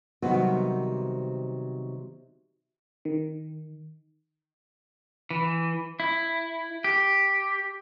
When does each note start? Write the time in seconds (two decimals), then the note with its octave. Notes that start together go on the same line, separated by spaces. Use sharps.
0.22 C3 D#3 F#3 G3 B3
3.05 D#3
5.30 E3
6.00 E4
6.84 G4